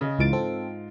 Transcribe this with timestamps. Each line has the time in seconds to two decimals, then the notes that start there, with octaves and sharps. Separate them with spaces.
0.01 C#3 D#5
0.19 C#2 G#2 E3 F4 A6 D7
0.33 C4 A4